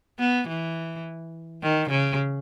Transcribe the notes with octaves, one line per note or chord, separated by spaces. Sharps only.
B3
E3
D#3
C#3